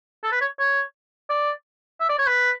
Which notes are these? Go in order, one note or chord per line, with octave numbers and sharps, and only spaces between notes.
A4
B4
C#5
C#5
D5
E5
D5
C#5
B4